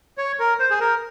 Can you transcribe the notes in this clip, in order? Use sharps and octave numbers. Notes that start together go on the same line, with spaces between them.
C#5
A#4
C5
G#4
A#4